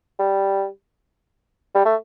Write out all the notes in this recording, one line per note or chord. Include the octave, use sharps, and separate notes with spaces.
G3
G3
A3